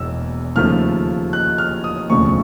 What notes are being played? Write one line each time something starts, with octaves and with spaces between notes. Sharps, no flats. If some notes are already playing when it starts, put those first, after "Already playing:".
Already playing: E1 E2 E6
D#2 C#3 F3 A3 F6
F#6
F6
D#6
E1 D2 C#3 F3 A3 C#6